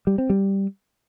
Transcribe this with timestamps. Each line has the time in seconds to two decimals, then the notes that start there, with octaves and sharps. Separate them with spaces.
0.07 G3
0.18 C4
0.30 G3